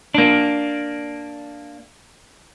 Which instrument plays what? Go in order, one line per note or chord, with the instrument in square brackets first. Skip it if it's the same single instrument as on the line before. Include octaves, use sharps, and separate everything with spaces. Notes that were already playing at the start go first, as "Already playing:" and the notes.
[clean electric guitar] A#3 D4